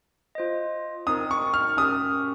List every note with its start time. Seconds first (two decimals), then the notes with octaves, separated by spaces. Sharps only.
0.35 F4 C5 D#5
1.07 C4 D#4 A#4 D#6
1.31 C#6
1.54 F6
1.77 C#4 G4 A#4 D#6